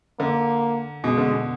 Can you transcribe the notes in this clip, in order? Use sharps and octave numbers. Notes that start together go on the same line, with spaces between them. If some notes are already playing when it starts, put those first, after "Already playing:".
D3 A#3
B2 G#3
D3
B2